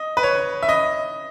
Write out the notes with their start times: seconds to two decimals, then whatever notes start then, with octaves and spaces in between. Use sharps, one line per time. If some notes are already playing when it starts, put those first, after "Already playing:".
Already playing: D#5
0.17 B4
0.23 C#5
0.63 E5
0.69 D#5